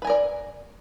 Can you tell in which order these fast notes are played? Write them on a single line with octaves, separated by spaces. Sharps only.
B4 G#5 A#4 D5